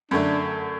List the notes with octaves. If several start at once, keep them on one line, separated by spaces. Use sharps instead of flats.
F#2 D3 A3 D4